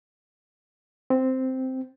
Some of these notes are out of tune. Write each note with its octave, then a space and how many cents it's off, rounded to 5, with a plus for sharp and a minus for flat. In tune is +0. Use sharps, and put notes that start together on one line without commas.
C4 -5